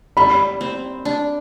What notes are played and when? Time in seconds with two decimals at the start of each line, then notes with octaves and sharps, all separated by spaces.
0.17 G3 B5
0.61 C4
1.05 D4